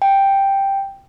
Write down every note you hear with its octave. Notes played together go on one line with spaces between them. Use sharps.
G5